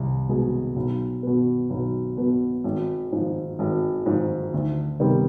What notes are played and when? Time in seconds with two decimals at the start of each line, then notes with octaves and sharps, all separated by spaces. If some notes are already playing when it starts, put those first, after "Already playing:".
Already playing: C2
0.29 B2 G#3
0.76 B1
1.23 B2 B3
1.70 B1
2.17 B2 B3
2.64 G#1
3.12 G#2 F3
3.59 G#1
4.06 G#2 F3
4.54 D2
5.00 C3 D#3 G3 B3